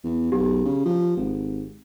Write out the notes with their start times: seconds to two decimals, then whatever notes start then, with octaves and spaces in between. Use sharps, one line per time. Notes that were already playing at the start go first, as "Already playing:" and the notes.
0.04 E2
0.32 B1 G4
0.65 C#3
0.85 F3
1.17 G#1